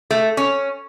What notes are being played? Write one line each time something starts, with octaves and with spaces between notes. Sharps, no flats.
A3
C#4